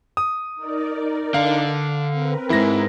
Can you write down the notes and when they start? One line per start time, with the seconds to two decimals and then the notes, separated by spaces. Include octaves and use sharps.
0.17 D#6
0.55 D#4 A#4 D5
1.34 D3 F5
2.11 C4 A#4 B4
2.50 E2 G#2 E4 A#6